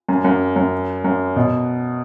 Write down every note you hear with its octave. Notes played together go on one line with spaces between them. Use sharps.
F#2
F#2
F#2
F#2
B2